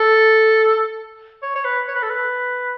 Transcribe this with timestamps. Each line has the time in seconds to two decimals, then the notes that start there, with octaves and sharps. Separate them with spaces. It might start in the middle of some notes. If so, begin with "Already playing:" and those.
Already playing: A4
1.43 C#5
1.56 C#5
1.65 B4
1.88 C#5
1.95 B4
2.03 A4
2.10 B4